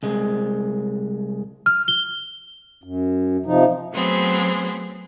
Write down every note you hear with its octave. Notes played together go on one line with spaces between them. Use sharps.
C2 G#3
F6
G7
F#2
C3 F3 D#4
F#3 A3 B3 C4 G#4